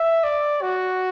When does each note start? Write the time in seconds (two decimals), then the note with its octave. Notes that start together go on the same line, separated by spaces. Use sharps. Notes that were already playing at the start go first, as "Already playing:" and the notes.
Already playing: E5
0.23 D5
0.62 F#4